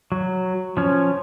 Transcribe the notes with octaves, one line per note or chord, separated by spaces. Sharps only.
F#3
F3 C#4